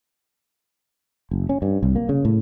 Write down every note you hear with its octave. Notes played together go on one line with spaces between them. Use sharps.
F#1
C#4
G2
C2
A#3
C#3
A2